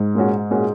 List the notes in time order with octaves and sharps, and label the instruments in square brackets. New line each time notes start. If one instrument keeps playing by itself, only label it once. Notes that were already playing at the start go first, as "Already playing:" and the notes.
Already playing: [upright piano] G#2
[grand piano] A#2 G#3 C#4 F#4
A#2 G#3 C#4 F#4